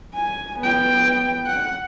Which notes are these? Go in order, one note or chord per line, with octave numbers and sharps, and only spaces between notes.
G#5
B3 G5
F#5